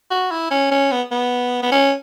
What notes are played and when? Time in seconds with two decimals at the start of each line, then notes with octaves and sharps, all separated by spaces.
0.11 F#4
0.31 E4
0.51 C#4
0.71 C#4
0.91 B3
1.11 B3
1.62 B3
1.71 C#4